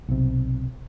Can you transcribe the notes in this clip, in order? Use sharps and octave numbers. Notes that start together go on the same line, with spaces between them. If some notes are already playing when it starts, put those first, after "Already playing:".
B1 C3